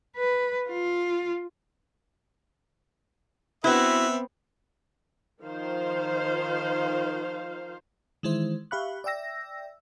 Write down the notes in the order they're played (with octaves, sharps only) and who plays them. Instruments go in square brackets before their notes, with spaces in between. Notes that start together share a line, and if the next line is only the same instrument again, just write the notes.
[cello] B4
F4
[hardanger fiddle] B3 C4 [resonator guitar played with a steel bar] E4 F#4 [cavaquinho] B4 [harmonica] E5
[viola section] D#3 F3 C5 F5
[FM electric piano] D#3 E3 G#3 E4 C5
G4 E5 F5 B5 C#6 F#6
D5 E5 G5 E6 A#6